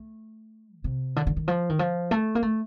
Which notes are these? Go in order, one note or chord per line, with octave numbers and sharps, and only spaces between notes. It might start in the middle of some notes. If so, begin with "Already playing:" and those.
Already playing: A3
D3
C3
D3
D3
D#3
F3
D#3
F3
A3
A#3
A3